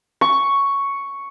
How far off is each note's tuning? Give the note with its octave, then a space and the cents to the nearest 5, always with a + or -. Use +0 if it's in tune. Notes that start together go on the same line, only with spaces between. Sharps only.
C#6 +0